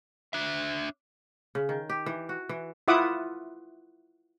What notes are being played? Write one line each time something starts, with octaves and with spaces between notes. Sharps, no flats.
D4 E5
C#3
D#3
G4
E3
F#4
E3
E4 F4 E5 F#5 D6 D#6